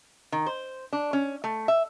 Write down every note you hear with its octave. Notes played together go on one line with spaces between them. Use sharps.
D#3
C5
D4
C#4
A3
E5